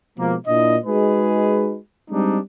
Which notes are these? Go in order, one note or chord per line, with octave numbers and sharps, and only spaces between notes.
B2 F3 G#3 A#3
A#2 D4 E4 D#5
G#3 D#4 F#4 G#4 B4
G3 G#3 C4 D4 D#4